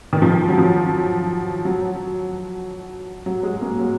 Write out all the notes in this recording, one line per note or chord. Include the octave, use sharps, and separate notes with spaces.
D#3
F3
F#3
F3
F#3
F#3
G#3
A#3
F#3